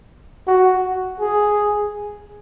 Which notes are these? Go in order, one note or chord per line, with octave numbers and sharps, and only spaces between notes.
F#4
G#4